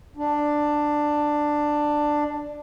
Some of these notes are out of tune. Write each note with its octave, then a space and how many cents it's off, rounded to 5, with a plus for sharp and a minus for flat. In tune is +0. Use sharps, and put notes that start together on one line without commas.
D4 +10